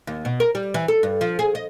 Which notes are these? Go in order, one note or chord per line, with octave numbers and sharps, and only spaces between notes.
D#2
B2
A#4
G3
E3
A4
G2
F3
G#4
D#5